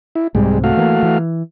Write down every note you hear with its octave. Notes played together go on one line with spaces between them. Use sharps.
E4
C2 G#2 C3 G3 G#3
A3 F#4 F5
E3 A#3
E3